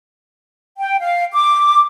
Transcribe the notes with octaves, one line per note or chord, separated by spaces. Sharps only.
G5
F5
D6